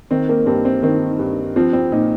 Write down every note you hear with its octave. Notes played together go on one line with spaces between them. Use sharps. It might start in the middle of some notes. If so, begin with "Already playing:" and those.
D#3 C4
A#3
G2 C4
C4
D#3 C4
G2
F3 C4
C4
A#2 D#4